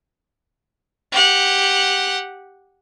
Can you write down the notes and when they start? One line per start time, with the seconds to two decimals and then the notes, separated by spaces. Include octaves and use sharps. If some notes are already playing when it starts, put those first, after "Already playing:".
1.12 G4 F#5